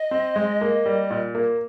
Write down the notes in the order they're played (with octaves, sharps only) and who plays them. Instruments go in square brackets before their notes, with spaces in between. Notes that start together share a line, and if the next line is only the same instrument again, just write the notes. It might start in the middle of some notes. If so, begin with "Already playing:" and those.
Already playing: [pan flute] D#5
[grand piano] C4
G#3
A#3
G3
A#2
A#3